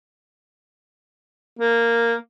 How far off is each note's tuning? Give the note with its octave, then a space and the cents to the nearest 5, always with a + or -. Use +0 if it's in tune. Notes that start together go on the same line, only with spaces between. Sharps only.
A#3 -5